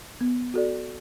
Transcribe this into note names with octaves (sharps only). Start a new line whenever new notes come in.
B3
F#4 A4 D5